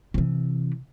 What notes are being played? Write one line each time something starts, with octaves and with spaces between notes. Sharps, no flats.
C3 E3